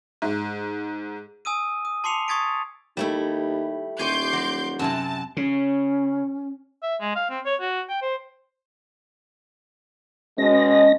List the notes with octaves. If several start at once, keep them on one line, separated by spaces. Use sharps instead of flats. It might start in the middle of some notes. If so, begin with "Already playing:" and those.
G#2
G#5 D#6 E6 D#7
D#6
A5 C6 D6 C7 C#7 F7
C#6 D#6 G#6 A6 B6 D7
D#2 G3 A3 E4
D#1 C#5 G#5 C6 D6 G6
F#3
F#2 C3 F#3 A5
C#3 C#4
E5
G#3
F5
C4
C#5
F#4
G5
C5
B2 G#3 C#4 D#5 A#6